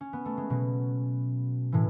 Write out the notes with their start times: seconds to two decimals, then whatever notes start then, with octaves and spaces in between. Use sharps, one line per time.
0.01 C#4
0.13 B3
0.25 A3
0.37 G#3
0.50 B2 F#3
1.72 A2 E3